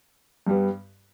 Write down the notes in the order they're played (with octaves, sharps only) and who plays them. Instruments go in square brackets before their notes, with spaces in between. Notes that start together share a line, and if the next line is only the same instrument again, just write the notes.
[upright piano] G2 G3 B3